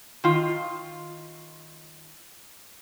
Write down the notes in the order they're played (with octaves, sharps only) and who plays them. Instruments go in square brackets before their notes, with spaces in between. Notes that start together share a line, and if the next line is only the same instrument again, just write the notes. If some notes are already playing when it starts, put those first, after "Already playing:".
[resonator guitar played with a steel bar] D#3 F4